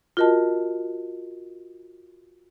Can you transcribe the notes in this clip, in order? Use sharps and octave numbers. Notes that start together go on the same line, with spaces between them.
F4 F#4 A#4 D#5 A5